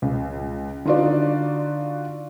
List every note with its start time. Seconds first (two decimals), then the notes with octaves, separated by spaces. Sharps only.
0.02 C#2
0.85 D3 D#4 F4 F#4 D5